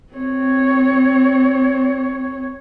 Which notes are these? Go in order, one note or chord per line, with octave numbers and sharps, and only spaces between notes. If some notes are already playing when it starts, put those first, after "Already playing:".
C4 C#5